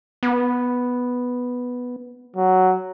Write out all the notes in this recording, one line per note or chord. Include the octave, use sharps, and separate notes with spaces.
B3
F#3